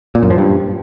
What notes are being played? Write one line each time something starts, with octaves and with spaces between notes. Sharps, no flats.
A#2
F#2
F3
G2